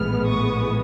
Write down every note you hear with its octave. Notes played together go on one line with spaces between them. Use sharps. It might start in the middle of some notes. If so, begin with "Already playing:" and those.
Already playing: A#1 A2 E3 G#3 B3 F6
C#6 D#6